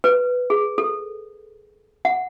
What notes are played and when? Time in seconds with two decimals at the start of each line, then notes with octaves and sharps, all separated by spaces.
0.04 B4
0.50 G#4
0.78 A4
2.05 F#5